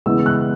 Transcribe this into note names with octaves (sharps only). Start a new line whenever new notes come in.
C#3 E3 G#3 B3 E6
F#6